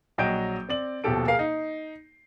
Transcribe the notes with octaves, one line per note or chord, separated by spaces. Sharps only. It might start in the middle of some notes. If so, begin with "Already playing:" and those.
A#1 F#3 D#5 G5 G6 D7
C4 D5 F#7
D#1 B2 F3 G4 A4 D7
G#4 A#4 F5 C7
D#4